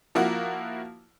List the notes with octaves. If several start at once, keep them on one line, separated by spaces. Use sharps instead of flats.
F3 A#3 E4 F#4